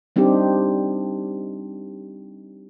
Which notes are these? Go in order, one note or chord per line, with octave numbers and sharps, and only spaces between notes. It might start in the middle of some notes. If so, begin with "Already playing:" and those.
G3 C4 D4 D#4 G4